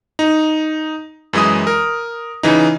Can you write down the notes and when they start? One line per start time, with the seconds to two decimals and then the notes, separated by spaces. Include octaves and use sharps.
0.19 D#4
1.33 F#2 E3 G#3 E4 D#6
1.67 A#4
2.43 C#3 E3 D#4